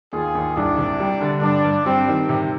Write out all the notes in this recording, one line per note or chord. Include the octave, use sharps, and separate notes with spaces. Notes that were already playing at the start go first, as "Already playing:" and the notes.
D#2 F4 G#4
D#2
C2 D4
C3
G3
D3
G2 D4
G2
G3 C4
D#3
C3